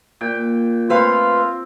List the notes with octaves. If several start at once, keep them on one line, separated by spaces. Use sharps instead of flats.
A#2 G5
A3 C4 F4 B4 F5